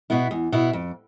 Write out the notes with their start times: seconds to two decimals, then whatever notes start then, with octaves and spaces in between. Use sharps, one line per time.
0.10 B2 B3 E4
0.31 E2
0.52 B2 B3 E4
0.73 F2